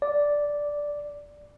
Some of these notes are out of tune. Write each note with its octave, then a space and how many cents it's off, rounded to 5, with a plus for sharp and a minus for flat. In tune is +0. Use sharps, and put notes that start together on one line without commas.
D5 -5